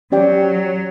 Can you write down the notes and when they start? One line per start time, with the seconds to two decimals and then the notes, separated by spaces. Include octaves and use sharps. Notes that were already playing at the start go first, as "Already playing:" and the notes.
0.12 F#3 C#4 G4 D5 G5